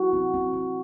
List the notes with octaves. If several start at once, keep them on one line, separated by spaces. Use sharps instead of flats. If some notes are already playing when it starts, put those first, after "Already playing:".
Already playing: E4 F#4
C4
C4
C4